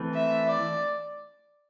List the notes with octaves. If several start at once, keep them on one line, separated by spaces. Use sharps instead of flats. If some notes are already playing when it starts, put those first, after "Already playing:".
Already playing: E3 A3 C4 E4
E5
D5